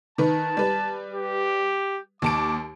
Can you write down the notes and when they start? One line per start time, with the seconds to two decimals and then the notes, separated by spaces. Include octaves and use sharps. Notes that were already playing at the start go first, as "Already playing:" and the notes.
0.18 D#3 B4 A5
0.57 G3 B4
1.12 G4
2.22 D#2 A5 D6 D7